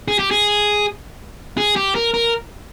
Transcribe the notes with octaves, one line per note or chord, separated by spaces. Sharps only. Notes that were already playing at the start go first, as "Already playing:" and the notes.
G#4
G4
G#4
G#4
G4
A#4
A#4